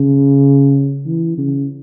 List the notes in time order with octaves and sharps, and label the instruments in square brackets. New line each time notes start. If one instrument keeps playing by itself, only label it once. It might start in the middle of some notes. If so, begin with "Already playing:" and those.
Already playing: [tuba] C#3
E3
C#3